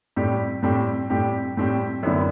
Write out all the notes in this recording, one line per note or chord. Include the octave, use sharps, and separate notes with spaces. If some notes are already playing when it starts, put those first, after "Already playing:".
A2 G3 C4 G4
A2 G3 C4 G4
A2 G3 C4 G4
A2 G3 C4 G4
F#2 D3 G3 B3 E4